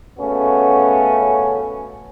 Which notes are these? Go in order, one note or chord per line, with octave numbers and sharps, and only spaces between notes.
C#3 A3 B3 C#4 F#4